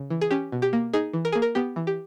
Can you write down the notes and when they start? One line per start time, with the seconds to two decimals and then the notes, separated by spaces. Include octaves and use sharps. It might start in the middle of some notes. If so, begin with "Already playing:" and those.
Already playing: C#3
0.10 E3
0.21 G#4
0.31 C#4 G4
0.52 B2
0.62 G4
0.73 A#3
0.94 D#4 G#4
1.13 E3
1.25 A#4
1.32 A#3 G#4
1.42 A#4
1.55 B3 G4
1.76 E3
1.87 G4